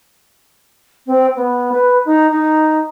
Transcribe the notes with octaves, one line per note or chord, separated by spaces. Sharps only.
C4
B3
B4
D#4
D#4